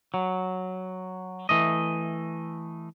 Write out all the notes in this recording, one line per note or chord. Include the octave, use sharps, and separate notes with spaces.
F#3
E3 A3 D#5